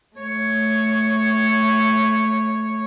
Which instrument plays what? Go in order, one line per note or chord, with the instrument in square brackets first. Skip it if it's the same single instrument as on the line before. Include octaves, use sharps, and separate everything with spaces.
[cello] A3 C#5